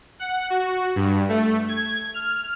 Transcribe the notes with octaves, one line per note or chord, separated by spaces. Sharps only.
F#5
F#4
G2
A3
G#6
F6